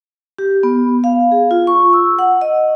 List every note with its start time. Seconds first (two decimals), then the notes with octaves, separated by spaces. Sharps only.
0.39 G4
0.63 B3
1.04 F5
1.32 G#4
1.51 F4
1.67 C#6
1.93 E6
2.19 F#5
2.41 D#5